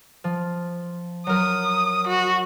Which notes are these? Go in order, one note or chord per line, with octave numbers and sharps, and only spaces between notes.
F3
F#3 A#4 D#6
F#4